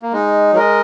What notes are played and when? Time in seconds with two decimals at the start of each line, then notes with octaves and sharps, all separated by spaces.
0.02 A#3
0.13 G#3 D#4
0.52 F#3
0.56 G#3 A#4 D#5